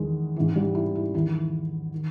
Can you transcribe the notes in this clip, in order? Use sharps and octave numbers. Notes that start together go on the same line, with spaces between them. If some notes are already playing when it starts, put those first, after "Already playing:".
Already playing: E2 D#3 G#3
G#2 E3
G3
E4
E4
E2 D#3 E4
D#3